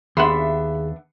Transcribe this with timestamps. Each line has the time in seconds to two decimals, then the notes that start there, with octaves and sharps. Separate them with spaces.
0.17 D#2 B3 D4 G#4 E5 F#5 C6